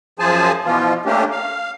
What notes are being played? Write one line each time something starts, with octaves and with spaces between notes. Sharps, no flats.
F#2 F3 G#4 C5 G#5 A5
B2 E3 F3 F4
A3 A#3 C#4 D4 G4
F5